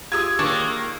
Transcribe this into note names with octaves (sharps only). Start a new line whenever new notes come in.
F4 G4 G#4 D#6 E6 G#6
D#3 A#3 D4 C#5 A5